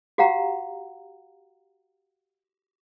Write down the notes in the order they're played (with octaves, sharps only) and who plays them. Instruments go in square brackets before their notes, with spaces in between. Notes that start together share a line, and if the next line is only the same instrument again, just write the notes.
[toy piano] F#4 G4 F5 F#5 A#5